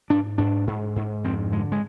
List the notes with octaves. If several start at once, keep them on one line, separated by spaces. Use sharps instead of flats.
G#2 D4
G#2 D4
G#2
G#2
F2 C4
D3 G#3
G#3